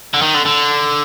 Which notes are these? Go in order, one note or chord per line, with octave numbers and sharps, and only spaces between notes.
D3
D#3
D3
D3